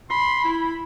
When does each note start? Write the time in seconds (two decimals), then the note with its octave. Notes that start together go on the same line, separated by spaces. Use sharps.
0.10 B5 C6
0.44 E4